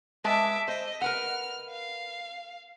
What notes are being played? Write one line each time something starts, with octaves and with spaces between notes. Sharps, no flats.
G#3 B4 E5 A5 D6
C5 D#5
A#4 B4 F#5 F6
F5